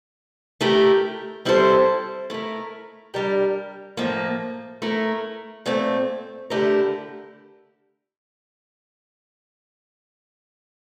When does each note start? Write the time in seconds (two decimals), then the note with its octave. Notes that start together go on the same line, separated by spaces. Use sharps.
0.61 A3 E4 G4 A#4
1.45 G3 C4 E4 A4 C5
2.30 A3 E4 A#4
3.14 G3 D4 G4 A#4
3.97 A2 F3 A#3
4.82 A3 E4 A#4
5.66 A#2 A3 C4
6.50 D3 A3 E4 G4 A#4